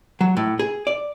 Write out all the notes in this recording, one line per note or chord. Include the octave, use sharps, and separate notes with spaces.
F#3
A2
G#4
D5